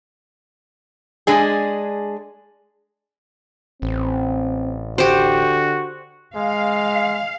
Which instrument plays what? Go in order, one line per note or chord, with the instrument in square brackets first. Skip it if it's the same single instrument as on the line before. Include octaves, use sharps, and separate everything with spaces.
[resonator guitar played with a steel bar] G#3 D4 G#4
[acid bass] A1 [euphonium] C4
[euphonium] D3 [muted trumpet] F#4 [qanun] G4 C5
[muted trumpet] G#3 [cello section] F5